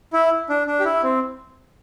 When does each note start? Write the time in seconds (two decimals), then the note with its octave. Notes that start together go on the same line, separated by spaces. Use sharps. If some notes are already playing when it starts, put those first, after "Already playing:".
0.13 E4
0.49 D4
0.67 D4
0.80 G4
0.85 E4
1.03 C4